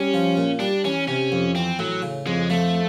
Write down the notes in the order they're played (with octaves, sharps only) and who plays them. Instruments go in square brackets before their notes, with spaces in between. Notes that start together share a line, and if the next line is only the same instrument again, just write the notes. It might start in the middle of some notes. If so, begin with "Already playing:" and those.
Already playing: [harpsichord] G3 [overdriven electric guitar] C#4
[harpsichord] F3
A#2
[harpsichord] G3 [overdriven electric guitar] D4
[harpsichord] E3 [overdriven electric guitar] C#4
[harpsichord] C3 [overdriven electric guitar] C#4
[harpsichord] F2
[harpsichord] E3 [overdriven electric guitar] C4
[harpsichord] A2 [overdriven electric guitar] F#3
[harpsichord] C#3
[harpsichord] F2 [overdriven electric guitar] G#3
[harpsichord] F3 [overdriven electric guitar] A3